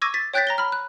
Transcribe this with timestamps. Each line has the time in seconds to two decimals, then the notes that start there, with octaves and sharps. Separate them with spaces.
0.02 C#6 D6 E6 G#6 A#6 D#7
0.14 A6 B6
0.34 C#5 G5 F#6 G6 A6 B6
0.47 A#5 A#6 G7
0.58 B5 F6
0.72 F#6